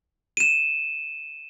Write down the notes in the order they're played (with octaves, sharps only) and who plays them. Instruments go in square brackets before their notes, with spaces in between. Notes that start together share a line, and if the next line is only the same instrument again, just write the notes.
[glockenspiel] D#7 E7